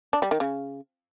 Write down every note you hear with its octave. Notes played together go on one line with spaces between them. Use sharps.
D4
G3
D#3
C#3